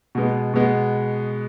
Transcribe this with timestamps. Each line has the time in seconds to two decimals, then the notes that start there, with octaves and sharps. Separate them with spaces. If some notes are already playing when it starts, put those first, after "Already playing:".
0.15 B2 G#3 B3
0.54 B2 G#3 B3